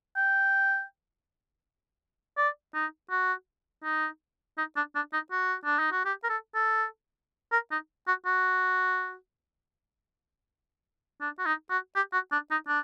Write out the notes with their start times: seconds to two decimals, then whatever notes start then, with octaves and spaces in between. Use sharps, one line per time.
0.16 G5
2.37 D5
2.74 D#4
3.11 F#4
3.84 D#4
4.58 D#4
4.76 D4
4.95 D4
5.13 D#4
5.31 F#4
5.65 D4
5.79 D#4
5.92 F#4
6.05 G4
6.24 A#4
6.29 A4
6.55 A4
7.52 A#4
7.72 D#4
8.07 F#4
8.26 F#4
11.21 D4
11.39 F#4
11.46 D#4
11.70 F#4
11.96 G4
12.13 F#4
12.32 D4
12.51 D#4
12.68 D4